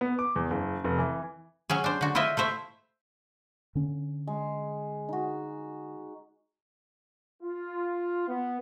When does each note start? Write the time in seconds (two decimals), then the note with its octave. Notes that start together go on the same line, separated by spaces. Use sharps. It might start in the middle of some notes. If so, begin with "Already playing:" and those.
0.01 B3
0.19 D6
0.36 E2
0.50 F#1
0.84 F1
0.98 E3
1.70 F#3 C#4 G#4
1.84 D4 C5
2.01 D3 F#4
2.15 E4 F4 C5 D#5 E5
2.37 A3 E4 C5 E5
3.75 D3 C#4
4.27 G#3
5.09 D#4 F#4
7.42 F4
8.27 B3